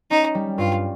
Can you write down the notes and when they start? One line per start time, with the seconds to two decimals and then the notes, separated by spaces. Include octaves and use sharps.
0.11 C#4 D#4
0.35 G3
0.58 G2 F4